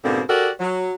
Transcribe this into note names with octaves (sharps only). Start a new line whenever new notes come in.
G#2 B2 D3 A#3 C4
F#4 G4 A4 A#4 D5 F#5
F#3